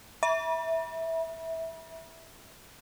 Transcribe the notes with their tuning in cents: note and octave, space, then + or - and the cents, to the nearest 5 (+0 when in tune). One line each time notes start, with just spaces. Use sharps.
E5 -10 B5 -40